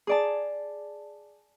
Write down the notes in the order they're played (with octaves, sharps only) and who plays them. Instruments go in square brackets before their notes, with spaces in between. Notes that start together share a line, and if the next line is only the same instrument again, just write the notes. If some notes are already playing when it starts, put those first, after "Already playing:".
[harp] G#4 D5 A5